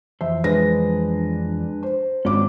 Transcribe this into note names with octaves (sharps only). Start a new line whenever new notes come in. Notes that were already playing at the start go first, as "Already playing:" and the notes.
F2 E3 C5 E5
G#3 D4 B4 A#6
C5
G#1 C#4 D4 D6